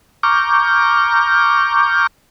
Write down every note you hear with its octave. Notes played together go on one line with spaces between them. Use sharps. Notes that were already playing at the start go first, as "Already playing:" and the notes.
A#5 C#6 D6 F6 G6